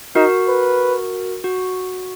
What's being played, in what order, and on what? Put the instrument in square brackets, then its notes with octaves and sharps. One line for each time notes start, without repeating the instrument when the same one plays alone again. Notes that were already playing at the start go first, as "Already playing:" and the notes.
[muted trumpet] D#4 [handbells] F#4 A#4
[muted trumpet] B4
[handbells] F#4